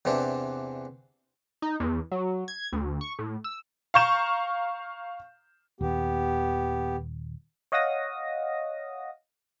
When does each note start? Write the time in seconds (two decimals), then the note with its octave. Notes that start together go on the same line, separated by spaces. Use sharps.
0.05 E2 C3 E3 D4
1.62 D#4
1.80 E2
2.11 F#3
2.48 G#6
2.73 D2
3.01 C#6
3.19 A2
3.44 E6
3.94 F5 A#5 C#6 G6 E7
5.81 D#1 D#2 B3 G4
7.72 C#5 D#5 F5 F#5 D#6 A#6